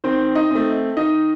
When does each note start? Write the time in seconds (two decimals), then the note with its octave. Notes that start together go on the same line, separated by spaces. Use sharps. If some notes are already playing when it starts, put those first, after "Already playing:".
0.04 D#3 C4 C5
0.35 D#4 D#5
0.51 A3 C4
0.97 D#3 D#4 D#5